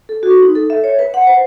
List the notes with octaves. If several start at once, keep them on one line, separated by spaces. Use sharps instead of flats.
A4
F#4
D#4
A4
E5
C#5
B4
F#5
C5